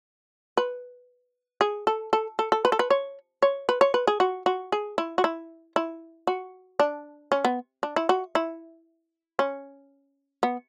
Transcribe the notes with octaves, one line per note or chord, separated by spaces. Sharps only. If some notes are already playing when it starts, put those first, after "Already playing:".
B4
G#4
A4
A4
A4
A4
B4
A4
B4
C#5
C#5
B4
C#5
B4
G#4
F#4
F#4
G#4
E4
F#4
E4
E4
F#4
D4
C#4
B3
D4
E4
F#4
E4
C#4
B3